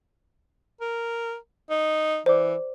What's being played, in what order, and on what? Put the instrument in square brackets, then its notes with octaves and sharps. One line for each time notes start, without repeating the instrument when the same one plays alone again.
[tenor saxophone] A#4
D#4
[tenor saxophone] E3 [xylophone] C5 D5 D6